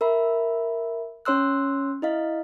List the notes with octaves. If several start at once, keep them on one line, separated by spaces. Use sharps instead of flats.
A#4 E5 B5
C#4 C#5 C6 E6 F#6
E4 D#5 F5